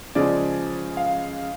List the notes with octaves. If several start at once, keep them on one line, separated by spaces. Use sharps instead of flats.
C#3 F3 G#3 D5
F5